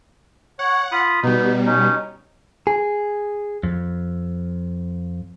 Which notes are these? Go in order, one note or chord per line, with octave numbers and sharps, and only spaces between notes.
C#5 F#5
F4 B5 D#6
B2 G3 B3 D#4
C#4 D#4
G#4
F2